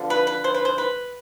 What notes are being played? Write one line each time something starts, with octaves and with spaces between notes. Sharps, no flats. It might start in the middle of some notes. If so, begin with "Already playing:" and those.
Already playing: D3 F3 B3
B4
B4
C5
B4
C5
B4